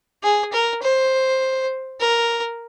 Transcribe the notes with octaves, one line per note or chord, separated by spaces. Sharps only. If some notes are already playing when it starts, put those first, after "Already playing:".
G#4
A#4
C5
A#4